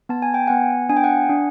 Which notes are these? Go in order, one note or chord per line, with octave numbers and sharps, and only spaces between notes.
B3 A5
G#5
G5
B3 F#5 G#5
D4 G#5
G5
F#5 G#5
D4